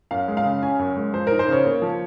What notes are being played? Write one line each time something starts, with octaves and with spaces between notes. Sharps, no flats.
F#2 F5
G#3
F5
C#3
C#4 G#5
F#2
G#3
F3 C5
D#4 A#4
C5
C#3 C#5
A#3
F3